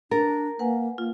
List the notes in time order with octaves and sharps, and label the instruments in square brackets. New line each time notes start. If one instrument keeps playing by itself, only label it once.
[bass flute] D4 [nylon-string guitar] A#4 [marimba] A6
[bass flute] A#3 [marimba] B4 F#5 G#5
[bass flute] A#3 [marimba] F4